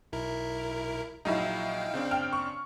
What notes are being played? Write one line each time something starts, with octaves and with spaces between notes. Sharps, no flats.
B1 E4 A#4
A#1 F#3 G#3 D#4 E4 F5 G5
C#3 C4 D4
G5 F6
C#6